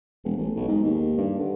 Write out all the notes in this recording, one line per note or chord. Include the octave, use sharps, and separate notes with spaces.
E1
A1
B1
G#2
D#2
G2
D3